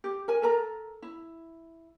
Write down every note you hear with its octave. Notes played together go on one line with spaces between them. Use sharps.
G4
A#4 G#5
A4 A#4 A#5
E4